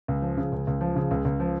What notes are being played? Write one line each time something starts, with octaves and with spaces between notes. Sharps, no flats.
C#2
F3
C#3
C#2
C#2
F3
C#3
C#2
C#2
F3